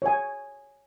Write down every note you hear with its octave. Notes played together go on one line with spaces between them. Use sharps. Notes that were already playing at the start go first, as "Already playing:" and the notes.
C#5 G#5